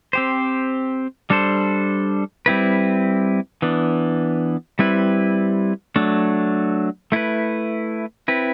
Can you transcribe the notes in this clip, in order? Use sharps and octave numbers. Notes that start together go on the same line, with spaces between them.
C4 G4 C5
G3 D4 A4 C5
G3 C4 E4 B4
E3 B3 D4
G3 C4 E4 B4
F#3 A3 D4
A3 E4 B4
C4 E4 B4